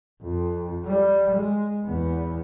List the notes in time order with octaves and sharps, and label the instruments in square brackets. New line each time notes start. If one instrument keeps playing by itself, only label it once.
[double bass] F2
G3
G#3
E2 B3